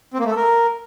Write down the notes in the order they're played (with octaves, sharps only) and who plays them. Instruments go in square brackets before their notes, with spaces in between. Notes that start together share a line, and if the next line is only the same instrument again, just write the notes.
[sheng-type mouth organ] C4
A#3
A3
A4
A#4